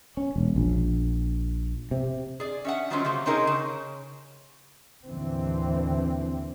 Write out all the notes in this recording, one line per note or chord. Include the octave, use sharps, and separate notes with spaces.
C#4
E1
A#1
C3
G#4 D5
C#4 E5 F#5
D#3 F#3 G3 C4 C#4 F4
C#3 F#3 A#3
C3 C4 C#4 D#4 G#4 A#4
C#3
D#2 A2 D3 E3 C4